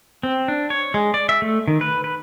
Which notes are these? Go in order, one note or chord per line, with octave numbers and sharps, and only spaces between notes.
C4
D4
C#5
G#3
D5
E5
A3
D#3
B4
B4